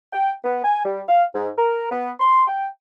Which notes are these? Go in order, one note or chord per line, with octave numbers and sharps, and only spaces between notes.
G5
B3
G#5
G3
F5
G#2
A#4
B3
C6
G5